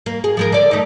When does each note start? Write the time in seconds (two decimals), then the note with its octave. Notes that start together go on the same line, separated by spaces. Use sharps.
0.06 A#3
0.24 G#4
0.37 F3 G#3 A#4
0.52 D3 D5
0.71 A3 D#4